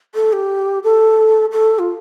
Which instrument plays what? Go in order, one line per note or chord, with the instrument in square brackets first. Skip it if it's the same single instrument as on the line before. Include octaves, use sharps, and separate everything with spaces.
[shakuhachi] A4
G4
A4
A4
F4